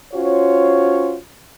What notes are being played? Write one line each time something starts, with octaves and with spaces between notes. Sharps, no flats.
C#4 F4 F#4 C5 C#5